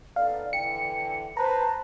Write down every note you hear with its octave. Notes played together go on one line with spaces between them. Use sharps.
B3 D#4 A4 D5 F5
D3 E3 G5 C#7
B4 C5 A5 A#5